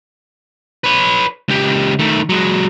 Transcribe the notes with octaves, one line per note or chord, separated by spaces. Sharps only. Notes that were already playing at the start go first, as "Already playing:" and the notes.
B4 C#5
C#2 G4
D#3 A3
F#3 G#3